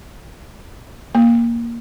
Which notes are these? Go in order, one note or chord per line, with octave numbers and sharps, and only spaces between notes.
A#3